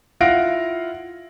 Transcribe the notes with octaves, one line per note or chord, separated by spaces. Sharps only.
E4 F4 F5 F#5 A#6 D7